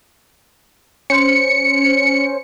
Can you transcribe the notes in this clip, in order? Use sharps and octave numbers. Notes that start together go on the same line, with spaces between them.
C#4 C5 C#7